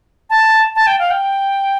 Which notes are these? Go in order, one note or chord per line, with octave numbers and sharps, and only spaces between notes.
A5
A5
G5
F5
G5